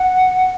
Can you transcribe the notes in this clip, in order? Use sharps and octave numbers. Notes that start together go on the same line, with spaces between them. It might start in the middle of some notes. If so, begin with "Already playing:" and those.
Already playing: F#5